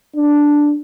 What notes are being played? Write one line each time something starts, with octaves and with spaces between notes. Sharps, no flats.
D4